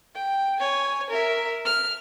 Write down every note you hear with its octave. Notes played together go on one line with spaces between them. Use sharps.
G5
C#5 G#5
A#4 E5
F6